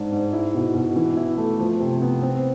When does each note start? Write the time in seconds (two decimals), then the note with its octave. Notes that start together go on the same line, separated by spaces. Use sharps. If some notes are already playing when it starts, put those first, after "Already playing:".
Already playing: G#2 D4
0.12 G#2
0.33 E4
0.54 B2
0.75 B2
0.96 E3
1.17 E4
1.38 A3
1.59 F3
1.80 C3
2.02 B3
2.23 C4